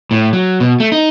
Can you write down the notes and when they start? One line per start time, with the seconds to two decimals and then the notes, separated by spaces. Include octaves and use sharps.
0.11 A2
0.33 F#3
0.60 B2
0.80 A3
0.92 D#4